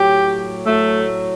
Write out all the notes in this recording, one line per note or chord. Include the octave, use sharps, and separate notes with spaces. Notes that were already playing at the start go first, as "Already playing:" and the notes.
Already playing: A2 F#3 G4
A2 F#3 A3